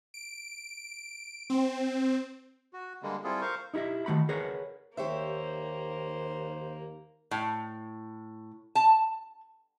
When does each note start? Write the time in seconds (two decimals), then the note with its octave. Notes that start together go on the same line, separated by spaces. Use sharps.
0.14 D7
1.50 C4
2.73 F#4
3.03 D3 G3 G#3 A#3
3.24 G3 C4 E4 F4 G#4 A4
3.41 A#4 C5 F5 C#6
3.74 D#4 E4 G4 D#5 E5
4.06 D#3 A3 F#4 B5
4.29 G#4 A#4 B4 C#5 F#5
4.97 D#2 A#3 G4 C5 C#5 E5
7.31 A2
8.75 A5